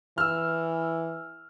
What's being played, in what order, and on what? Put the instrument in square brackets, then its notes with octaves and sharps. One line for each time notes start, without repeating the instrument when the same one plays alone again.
[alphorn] E3 [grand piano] E6 F6